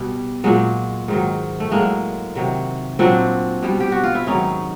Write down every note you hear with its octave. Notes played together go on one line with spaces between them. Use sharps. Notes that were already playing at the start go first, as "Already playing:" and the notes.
Already playing: B2 G3
A#2 F#3 G#3
G#2 D#3 F#3
A3
A2 F#3 G#3 A#3
C3 D#3 F#3
A#2 F#3 C4 D4
B2 G3
G4
F#4
F4
E4
G#2 D#3 F#3 C#4 D#4